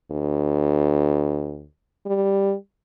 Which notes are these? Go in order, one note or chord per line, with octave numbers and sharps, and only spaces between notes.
D2
G3